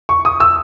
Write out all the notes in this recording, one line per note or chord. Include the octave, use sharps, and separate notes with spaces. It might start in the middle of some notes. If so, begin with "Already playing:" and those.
C#6
D#6
E6